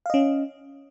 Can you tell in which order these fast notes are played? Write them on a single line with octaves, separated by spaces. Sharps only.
F5 D#5 C#4